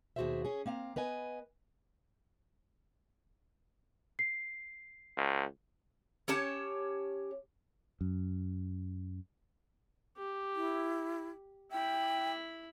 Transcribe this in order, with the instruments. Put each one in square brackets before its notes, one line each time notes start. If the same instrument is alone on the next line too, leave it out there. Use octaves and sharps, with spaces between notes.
[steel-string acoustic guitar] D#2 B2 F#4 G#4 C5 E5
C#4 G#4
A#3 C4 F5 A#5
B3 B4 D#5 G#5
[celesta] C7
[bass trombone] C#2
[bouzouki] C#4 G4 C#5 A5
[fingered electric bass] F#2
[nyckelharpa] G4
[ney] E4
[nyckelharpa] E4 B5 [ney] G5